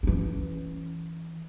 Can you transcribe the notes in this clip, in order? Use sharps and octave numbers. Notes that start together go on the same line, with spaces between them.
E3 C#4